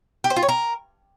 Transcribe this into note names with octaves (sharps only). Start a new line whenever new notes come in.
G4
C5
F4
C#5
A#4